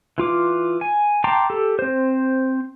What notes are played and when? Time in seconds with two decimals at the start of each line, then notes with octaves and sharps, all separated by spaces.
0.18 E3 F4 D6
0.81 G#5
1.24 G5 A5 A#5 C6 D6
1.50 G4 A4
1.79 C4 C5